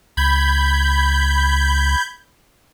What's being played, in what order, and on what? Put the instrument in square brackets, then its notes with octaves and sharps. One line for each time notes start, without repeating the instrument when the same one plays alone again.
[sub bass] C#2 [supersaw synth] B5 G6 G#6